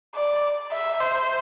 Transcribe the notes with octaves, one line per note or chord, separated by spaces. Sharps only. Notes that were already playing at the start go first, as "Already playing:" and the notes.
D5
E5
C5